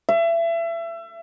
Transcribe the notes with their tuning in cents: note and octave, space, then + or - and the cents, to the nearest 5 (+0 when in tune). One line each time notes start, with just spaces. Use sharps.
E5 +30